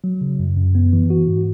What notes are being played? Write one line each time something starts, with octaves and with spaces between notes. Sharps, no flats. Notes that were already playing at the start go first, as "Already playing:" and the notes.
F#3
C#3
F#2
F#2
B3
E3
F#4
G#2